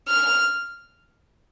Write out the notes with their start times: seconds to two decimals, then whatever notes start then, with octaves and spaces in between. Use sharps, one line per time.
0.08 F6